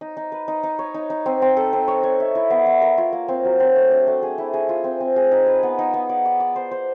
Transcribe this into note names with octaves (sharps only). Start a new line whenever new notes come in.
D#4
D#4
B4
D#4
D#4
C#5
D#4
D#4
C4
C4
A4
C4
C#5
C#5
E5
E4
B3
E4
A#4
F4
A#3
C4
F#3
C4
A3
D4
A3
G#4
E4
G#4
F4
C4
C4
G#4
D#4
B4
B3
D#4
B3
D5
D5
D5
C5
C5